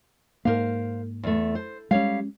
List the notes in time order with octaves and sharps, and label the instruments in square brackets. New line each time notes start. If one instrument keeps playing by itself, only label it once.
[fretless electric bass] G#2 A#3 [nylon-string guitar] A#4 C5 F5
[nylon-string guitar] E2 A3
C5
[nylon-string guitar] G3 C#5 F5 [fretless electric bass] G#3 C#4